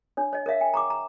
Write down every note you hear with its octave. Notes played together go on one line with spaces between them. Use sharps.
D4 C#5
C#5 D#5
A#4 C#5 E5 F5
G5 G#5
A#5 C#6 D6
A#5